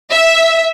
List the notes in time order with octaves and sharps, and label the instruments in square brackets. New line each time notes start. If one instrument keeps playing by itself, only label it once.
[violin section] E5